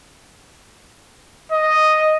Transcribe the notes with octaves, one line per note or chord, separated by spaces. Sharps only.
D#5